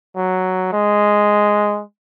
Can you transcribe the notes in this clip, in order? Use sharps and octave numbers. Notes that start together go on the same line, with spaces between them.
F#3
G#3